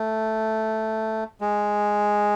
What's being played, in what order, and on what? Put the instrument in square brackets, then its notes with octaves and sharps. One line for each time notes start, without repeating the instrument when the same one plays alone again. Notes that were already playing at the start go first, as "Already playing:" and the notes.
Already playing: [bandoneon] A3
G#3